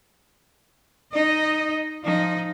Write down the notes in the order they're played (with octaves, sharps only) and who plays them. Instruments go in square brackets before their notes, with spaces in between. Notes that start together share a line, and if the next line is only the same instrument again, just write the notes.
[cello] D#4 D#5
F3 D#4